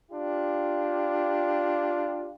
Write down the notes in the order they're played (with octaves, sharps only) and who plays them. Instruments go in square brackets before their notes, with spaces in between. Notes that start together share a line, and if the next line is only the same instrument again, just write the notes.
[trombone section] D4 F4 G4